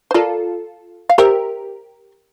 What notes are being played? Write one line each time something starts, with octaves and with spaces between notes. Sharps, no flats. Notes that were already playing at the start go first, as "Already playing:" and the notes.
C5
F4 A4 A#4 D5
F5
G4 A#4 C5 E5